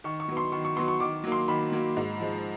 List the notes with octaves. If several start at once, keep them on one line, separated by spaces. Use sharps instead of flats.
D#3 C#6
C#6
F#3 B3
C6
D#3 C#6
C#6
F#3 B3 C6
C#6
D#3 D6
F#3 A#3
C6
D#3 B5
F#3 A#3
G#2
F3 G#3